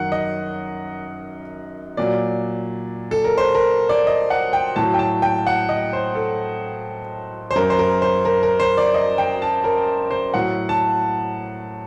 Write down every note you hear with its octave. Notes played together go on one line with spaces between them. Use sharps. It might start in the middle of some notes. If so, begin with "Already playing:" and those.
Already playing: F#2 D#3 F#3 F#5
D#5
A#2 F#3 D5
A4
A#4
C5
A#4
D5
D#5
F#5
G5
A2 A5
F#3
G5
A5
G5
F#5
D#5
C5
A4
C5
F#2 F#3 A#4
C5
A#4
C5
A#4
A#4
C5
D5
D#5
G5
A5
A#4
C5
A2 F#3 F#5
A5